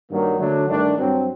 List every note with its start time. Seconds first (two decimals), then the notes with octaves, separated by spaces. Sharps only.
0.11 G2 D#3 F#3 A#3
0.39 D3 F#3 A3 D4
0.68 G2 D#3 A3 D4
0.97 G2 F#3 C4